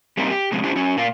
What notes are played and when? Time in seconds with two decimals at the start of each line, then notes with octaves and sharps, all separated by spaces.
0.17 G3 A#3 C4 D#4
0.31 G4
0.52 F2 C3 G#3 C4 C#4
0.63 C#4 D4 E4 G4 C5
0.76 F#3 C#4 C#5
0.97 A#2 A#4 D5 F5